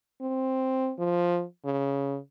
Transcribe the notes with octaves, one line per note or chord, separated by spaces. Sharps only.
C4
F3
C#3